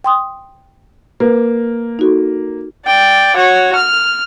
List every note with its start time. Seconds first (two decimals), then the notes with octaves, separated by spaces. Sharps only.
0.04 G5 C6 D#6
1.20 A#3 B4
1.99 D#4 F#4 A4
2.85 D5 G5
3.36 F#4 C#5
3.75 F6